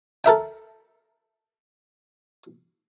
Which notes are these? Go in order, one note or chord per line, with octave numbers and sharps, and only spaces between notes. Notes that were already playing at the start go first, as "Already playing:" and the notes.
A4 A#4 E5 G5